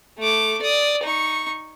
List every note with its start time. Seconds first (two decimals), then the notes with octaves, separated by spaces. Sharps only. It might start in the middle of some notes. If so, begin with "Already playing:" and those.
0.18 A3 D6
0.62 D5 D#6
1.03 D#4 C#6